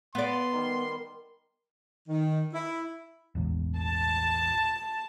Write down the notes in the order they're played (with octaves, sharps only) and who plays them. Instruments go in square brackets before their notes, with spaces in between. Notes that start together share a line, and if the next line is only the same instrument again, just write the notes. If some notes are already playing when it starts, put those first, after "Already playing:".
[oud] B3 D5 [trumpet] C6
[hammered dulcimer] D#3 G3
[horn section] D#3
E4
[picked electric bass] E1 A1 E2
[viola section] A5